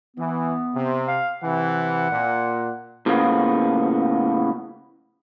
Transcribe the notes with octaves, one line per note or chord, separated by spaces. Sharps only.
E3 B3
C3
F5
C3 E3 F#5
A#2
A2 C#3 F3 A#3 B3